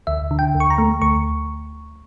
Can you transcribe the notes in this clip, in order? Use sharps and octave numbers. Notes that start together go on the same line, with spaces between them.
D2 E5
D3
G5
D2
C#6
A#5
A3
D2 C#6